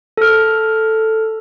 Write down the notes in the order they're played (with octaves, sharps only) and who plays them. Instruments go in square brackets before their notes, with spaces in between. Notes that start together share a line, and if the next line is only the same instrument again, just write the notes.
[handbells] A4 F6